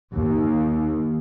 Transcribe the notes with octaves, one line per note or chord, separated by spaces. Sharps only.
D#2